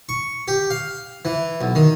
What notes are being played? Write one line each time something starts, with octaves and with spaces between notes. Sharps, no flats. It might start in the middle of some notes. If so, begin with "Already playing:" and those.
C#6
G4
F5
E3
B1
D#3